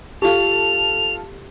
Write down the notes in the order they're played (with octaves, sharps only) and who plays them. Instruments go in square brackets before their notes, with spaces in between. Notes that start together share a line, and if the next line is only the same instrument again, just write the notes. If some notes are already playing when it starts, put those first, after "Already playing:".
[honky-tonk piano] F4 A4 [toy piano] G4 [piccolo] F7